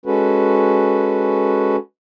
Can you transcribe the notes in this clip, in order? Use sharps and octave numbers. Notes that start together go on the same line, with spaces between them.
G#3 C#4 F#4 A4 B4